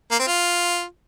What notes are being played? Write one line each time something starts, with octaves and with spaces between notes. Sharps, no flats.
A#3
C4
F4